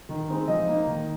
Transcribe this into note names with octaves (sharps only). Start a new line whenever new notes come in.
D#3
G#3 C4 D#4
F3 D#5
A#3 D#4
D#3